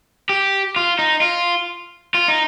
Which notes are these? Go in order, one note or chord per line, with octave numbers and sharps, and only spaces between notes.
G4
F4
D#4
F4
F4
D#4